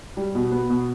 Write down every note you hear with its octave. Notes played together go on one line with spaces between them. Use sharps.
G3
B2
B3
B2